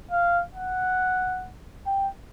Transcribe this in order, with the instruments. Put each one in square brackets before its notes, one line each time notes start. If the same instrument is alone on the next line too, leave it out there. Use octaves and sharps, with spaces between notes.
[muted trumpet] F5
F#5
G5